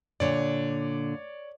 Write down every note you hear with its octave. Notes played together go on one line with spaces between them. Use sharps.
A#2 D3 C#5 D5